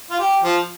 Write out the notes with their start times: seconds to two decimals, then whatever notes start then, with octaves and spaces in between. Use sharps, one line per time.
0.10 F4
0.19 G4
0.43 F3